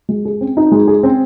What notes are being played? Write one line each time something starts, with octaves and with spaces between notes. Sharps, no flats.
G#3
G#4
C4
D#4
G#3
G#4
C4